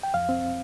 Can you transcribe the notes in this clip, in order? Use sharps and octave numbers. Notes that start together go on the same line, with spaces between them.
G5
F2 F5
C4